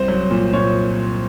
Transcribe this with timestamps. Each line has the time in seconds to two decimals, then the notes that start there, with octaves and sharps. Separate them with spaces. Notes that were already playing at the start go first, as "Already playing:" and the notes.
Already playing: C2 C5
0.08 F#3
0.31 A#2
0.53 A#2 C#5